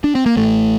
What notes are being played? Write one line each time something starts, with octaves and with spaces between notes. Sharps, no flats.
D4
C4
A#3
A1 A2 A3